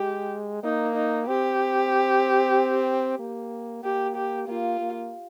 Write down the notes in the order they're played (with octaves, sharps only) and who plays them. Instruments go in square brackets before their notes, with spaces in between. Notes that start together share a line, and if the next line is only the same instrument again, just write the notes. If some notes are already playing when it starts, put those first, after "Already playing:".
Already playing: [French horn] G#3 [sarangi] G4
[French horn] A#3 [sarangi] D#4
[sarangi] D#4
[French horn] C4 [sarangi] G4
[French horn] A#3
[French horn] A#3 [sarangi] G4
[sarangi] G4
[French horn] A#3 [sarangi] F4
[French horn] A#3